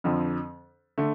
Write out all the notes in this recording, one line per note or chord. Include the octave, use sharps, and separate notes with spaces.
F2 D3 F3 C4
D3 A3